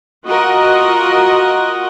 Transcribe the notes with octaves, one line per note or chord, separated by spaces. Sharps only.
F4 F#4 A#4 D#5 F#5